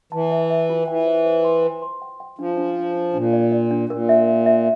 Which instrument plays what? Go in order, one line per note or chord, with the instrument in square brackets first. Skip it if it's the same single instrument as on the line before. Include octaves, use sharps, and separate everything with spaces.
[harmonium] E3 [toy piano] A5
[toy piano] E5
E5
F4
[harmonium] E3 [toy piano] G5
[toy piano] C5
C5
C6
G5
C6
G5
G5
[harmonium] F3 [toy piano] D4
[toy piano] D4
D4
D4
[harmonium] A#2 [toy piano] D4
[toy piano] D5
D5
D4
[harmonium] A#2 [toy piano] A#4
[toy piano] E5
E5
E5